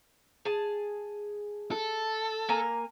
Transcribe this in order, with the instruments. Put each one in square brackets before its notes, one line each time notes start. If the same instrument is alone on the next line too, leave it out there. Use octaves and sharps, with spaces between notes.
[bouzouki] G#4 A5
[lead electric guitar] A4
[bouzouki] A#3 G#5 A#5